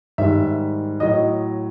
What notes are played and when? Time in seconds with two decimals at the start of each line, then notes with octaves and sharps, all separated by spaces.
0.18 G#2 D#3 G3 E5
1.00 A2 F#3 D#5